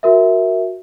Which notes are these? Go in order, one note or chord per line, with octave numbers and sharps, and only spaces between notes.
F#4 A#4 E5